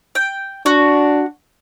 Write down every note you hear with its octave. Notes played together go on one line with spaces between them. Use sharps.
G5
D4 F#4